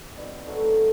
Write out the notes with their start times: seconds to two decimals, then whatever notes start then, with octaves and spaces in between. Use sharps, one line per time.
0.17 B2 G3 C4 D#4 B4
0.47 A2 F#3 A3 A4